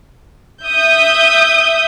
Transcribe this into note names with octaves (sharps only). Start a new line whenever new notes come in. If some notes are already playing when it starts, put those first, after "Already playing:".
E5 D#6 G6